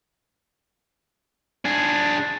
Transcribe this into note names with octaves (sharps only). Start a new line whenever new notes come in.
D4 G#4